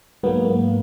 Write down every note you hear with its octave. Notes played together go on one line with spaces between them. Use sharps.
G#2 F#3 A#3 B3
A#3